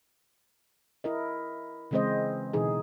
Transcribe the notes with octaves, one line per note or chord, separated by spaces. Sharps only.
E4 A#4 D#5
C#3 E3 G#3 C4 C5 D#5
B2 D3 E3 D#4 G#4